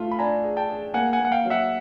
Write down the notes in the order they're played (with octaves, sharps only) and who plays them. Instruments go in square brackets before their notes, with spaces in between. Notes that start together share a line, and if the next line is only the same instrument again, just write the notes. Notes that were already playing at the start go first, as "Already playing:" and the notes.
Already playing: [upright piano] A3 F4
[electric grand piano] B5
[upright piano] D4 [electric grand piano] G#5 A#5
[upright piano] G#4
[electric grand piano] G5 A5
[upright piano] G#4
[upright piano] A#3 [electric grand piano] F#5 G#5
[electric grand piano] F#5 G#5
[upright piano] A#3
[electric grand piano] F#5
F5 G5
[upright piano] F#3
[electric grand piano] E5 F#5